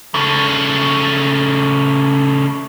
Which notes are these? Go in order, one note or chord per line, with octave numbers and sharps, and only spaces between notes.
C#3 A3